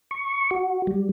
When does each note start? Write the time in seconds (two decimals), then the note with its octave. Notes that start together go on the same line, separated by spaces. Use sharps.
0.11 C#6
0.51 F#4
0.87 G3